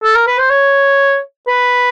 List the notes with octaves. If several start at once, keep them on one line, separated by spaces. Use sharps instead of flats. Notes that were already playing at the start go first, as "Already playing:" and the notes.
A4
A#4
B4
C5
C#5
B4